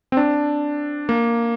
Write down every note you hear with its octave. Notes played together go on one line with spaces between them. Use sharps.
C4
D4
A#3